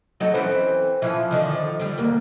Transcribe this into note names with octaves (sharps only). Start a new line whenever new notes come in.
F#3 D#4 A4
E3 C4 C#4
E3 F3
D3 D#3 F3
D3 G3
D2 A#3